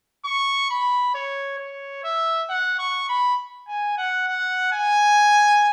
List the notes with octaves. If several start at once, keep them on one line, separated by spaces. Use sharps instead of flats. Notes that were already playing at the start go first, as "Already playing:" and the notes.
C#6
B5
C#5
C#5
E5
F#5
C#6
B5
G#5
F#5
F#5
G#5